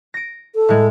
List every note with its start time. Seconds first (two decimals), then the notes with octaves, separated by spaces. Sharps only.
0.14 A#6 D7
0.55 A4
0.69 A2 G#3